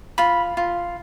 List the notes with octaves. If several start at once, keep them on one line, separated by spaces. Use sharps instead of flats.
F4 B5
F4